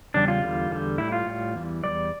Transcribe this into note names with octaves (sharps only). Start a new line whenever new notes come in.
E2 C#3 G3 D4
F4
E2 D3 G3
E2 D3 G3
A2 G3 E4
F4
A2 G3
E2 E3 G3
E2 E3 G3 D5